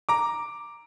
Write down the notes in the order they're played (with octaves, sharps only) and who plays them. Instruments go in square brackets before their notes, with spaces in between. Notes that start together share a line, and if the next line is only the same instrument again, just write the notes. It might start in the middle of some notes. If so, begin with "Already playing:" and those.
[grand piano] A#5 D6